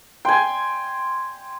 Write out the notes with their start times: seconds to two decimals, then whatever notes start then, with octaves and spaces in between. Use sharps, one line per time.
0.25 G5 G#5 C6